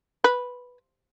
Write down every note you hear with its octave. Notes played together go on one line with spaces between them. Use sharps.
B4